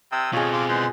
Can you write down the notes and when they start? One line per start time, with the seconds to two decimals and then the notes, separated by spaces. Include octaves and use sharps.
0.12 C3 D#6 E6
0.33 F2 B2 C4 F4 G#4 C#5 D#5 F5
0.53 F5 C6 D6
0.69 E2 G#3 C6